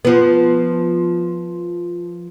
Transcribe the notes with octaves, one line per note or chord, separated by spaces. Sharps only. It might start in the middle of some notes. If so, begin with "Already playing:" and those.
F3 B3